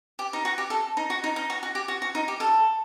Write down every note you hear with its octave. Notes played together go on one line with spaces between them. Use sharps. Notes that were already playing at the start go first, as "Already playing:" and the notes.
G4
D#4
F#4
G4
A4
D#4
F#4
D#4
D#4
F#4
F#4
G4
F#4
F#4
D#4
G4
A4